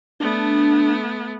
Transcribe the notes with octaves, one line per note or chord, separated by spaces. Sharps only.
A3 B3 D4